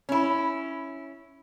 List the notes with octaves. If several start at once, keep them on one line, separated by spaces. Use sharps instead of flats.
C#4 E4